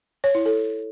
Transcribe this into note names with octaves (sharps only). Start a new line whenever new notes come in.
C#5
E4
A4